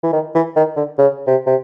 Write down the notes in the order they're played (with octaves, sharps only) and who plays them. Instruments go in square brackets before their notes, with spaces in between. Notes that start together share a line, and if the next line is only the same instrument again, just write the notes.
[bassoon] E3
D#3
E3
D#3
D3
C#3
C3
C3